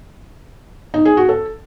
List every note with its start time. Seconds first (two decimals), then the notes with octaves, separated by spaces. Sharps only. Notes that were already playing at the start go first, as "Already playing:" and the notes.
0.94 D#4
1.05 G#4
1.17 F#4
1.29 A4